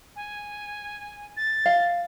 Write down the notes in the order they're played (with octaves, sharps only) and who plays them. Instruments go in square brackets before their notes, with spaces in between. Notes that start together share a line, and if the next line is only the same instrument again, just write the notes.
[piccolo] G#5
A6
[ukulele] F5